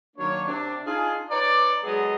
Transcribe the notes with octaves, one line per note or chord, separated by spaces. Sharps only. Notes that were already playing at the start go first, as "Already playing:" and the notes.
D#3 F#3 A#3 D4 C#5
C3 D4
D4 D#4 F4 G#4
D#4 B4 C#5 D5
F#3 G#3 B3 G#4 A4 D#5